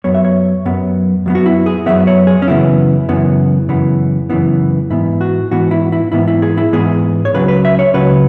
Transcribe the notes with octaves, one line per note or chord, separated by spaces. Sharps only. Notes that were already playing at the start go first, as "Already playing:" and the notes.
F#2 F#3 B3 C#5
E5
C#5
F#2 F#3 B3
F#2 F#3 B3
F#4
E4
G#4
F#2 F#3 B3 E5
C#5
G#4
C#4
F#2 C#3 E3 B3 E4
F#2 C#3 E3 B3
F#2 C#3 E3 B3
F#2 C#3 E3 B3
G#2 E3 B3 E4
F#4
G#2 E3 B3 F#4
E4
E4
G#2 E3 B3 E4
E4
G#4
E4
G#2 E3 B3 G#4
C#5
C#2 C#3 F#3 B4
B4
E5
C#5
C#2 C#3 F#3 B4